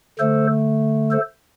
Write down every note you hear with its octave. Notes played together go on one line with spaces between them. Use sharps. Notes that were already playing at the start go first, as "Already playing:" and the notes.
D3 A3 A4 C5
A4 C5